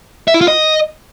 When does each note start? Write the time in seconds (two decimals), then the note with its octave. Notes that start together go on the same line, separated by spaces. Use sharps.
0.28 E5
0.34 E4
0.41 F4
0.48 D#5